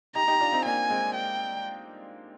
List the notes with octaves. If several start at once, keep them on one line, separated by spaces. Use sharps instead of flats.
D#4 G4 A#5
D#4 G4
D4 F4
C4 D#4
A#3 D4 G#5
G#3 C4
G5